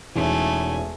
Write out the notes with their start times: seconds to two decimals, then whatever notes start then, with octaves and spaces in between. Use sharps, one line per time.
0.16 E1 E2 A3 C#4 D#4 G#5